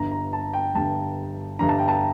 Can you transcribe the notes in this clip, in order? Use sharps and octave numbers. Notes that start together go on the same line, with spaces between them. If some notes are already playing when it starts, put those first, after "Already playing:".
Already playing: G1 G2 D3 A#5
A#5
A5
G5
G1 G2 D3 A5
G1 G2 D3 A#5
A5
G5
A5